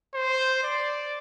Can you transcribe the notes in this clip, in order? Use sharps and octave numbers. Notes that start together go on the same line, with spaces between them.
C5
D5